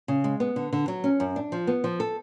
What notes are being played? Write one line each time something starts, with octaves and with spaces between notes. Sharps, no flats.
C#3
G#3
B3
D3
D3
F#3
C#4
F#2
D4
F3
B3
F3
A4